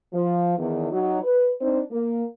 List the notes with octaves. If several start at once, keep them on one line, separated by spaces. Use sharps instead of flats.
F3
E2 D#3
F#3 D#4
B4
C4 D4 D#4 C5
A#3